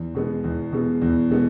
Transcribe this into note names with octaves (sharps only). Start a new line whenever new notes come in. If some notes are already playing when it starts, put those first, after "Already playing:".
Already playing: E2
B2 G#3 B3
E2
B2 G#3 B3
E2
B2 G#3 B3